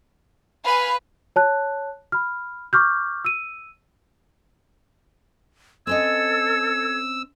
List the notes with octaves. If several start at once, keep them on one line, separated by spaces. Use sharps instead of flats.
B4 F5 G#5 B5
C#5 A5 F#6
B5 F6
C#6 D6 F6 G6
E6 D#7
C4 C#4 A4 D#5 E6 G#6